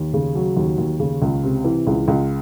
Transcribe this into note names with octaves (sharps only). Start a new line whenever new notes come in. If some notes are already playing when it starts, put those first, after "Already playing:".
Already playing: D#2
C#3
F#3
D#2
D#2
C#3
C#2
C3
E3
C#2
C#2